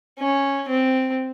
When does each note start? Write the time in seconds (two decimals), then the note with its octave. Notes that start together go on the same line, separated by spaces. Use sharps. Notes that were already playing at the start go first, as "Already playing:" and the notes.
0.19 C#4
0.68 C4